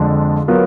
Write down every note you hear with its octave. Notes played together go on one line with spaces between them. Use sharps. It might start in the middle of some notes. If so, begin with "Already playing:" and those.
Already playing: F2 D3 F3 G#3 D4
F#3 B3 F4 A#4